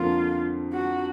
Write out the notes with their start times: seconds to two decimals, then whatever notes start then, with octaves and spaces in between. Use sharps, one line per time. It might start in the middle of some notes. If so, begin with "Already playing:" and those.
Already playing: F2 D3 F3 A#3 F4
0.73 F#4